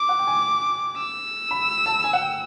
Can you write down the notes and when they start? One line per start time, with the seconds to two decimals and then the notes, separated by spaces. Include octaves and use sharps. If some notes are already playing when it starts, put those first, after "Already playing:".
Already playing: D6
0.09 F#5
0.19 G5
0.27 G#5
0.98 E6
1.51 B5
1.86 A5
2.04 G#5
2.13 F#5
2.21 G5